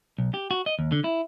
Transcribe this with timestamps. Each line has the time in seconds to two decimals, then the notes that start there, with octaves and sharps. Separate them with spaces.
0.18 B1
0.34 G4
0.51 F#4
0.66 D#5
0.79 D#2
0.92 D3
1.04 E4